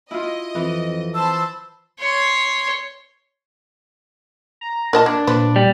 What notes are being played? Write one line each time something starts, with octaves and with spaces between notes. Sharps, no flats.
E4 F4 D#5
F2 E3
C5 A5 B5 E6
C#5 C6
A#5
A#2 A#4 D#5 A5
A#3 D4
A#2 F3 B4
G3